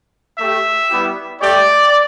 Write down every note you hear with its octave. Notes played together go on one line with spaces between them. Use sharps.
A3 G4 E5
G3 B3 E4 G4
A3 G4 D5